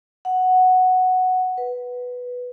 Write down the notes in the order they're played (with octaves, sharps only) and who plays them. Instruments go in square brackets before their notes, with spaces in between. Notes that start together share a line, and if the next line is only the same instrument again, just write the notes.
[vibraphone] F#5
B4